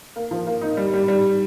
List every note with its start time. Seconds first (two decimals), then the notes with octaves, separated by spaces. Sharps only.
0.16 A#3
0.31 F3
0.47 A#3
0.61 D#4
0.77 G3
0.93 G3
1.08 G3